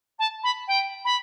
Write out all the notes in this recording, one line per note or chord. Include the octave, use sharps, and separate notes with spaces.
A5
B5
G5
B5